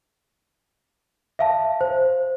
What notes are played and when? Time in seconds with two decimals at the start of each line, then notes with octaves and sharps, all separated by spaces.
1.39 E5 F5 A5
1.81 C5